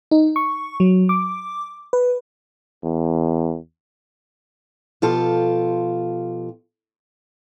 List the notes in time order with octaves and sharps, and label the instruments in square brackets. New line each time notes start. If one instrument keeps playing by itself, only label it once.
[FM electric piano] D#4
C#6
F#3
D6
B4
[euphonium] E2
[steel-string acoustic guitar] B2 F3 F4 G4 A4